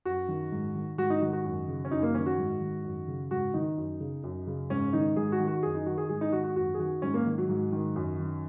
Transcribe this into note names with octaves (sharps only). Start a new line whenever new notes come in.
F#2 F#4
D#3
G#2
D#3
G#2 F#4
D#4
D#3 F#4
F#4
F#2
C#3
C#4
F#2 D#4
A#3
D#3 C#4
F#4
G#2
D#3
F#2
C#3
G#2 F#4
D#3 D#4
F#2
C#3
F#2
C#3
G#2 C#4
D#3 D#4
G#2 G#4
F#4
D#3
F#4
F#2 G#4
D#4
D#3 F#4
G#4
G#2 G#4
D#4
D#3 F#4
F#4
F#2 F#4
G#4
D#3 F#4
G#2 C#4
A#3
D#3
F#3
G#2
D#3
F#2
D#3